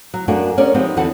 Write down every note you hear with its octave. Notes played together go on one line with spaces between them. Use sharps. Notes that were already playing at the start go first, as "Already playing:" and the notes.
F#3
F#2 A3 A#3 D4 F#4 G#5
C#4 G#4 A#4 C#5 D5
F3 G#3 B3 C4 D#4 G4
E2 D3 E3 F#4 F#5 A5